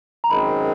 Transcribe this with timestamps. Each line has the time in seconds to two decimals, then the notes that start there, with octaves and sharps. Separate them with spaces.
0.24 A#5
0.30 F#2 D#3 G#3 C4 B5